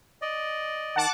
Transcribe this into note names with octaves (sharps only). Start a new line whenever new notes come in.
D5 D#5
D#3 F#5 A5 D6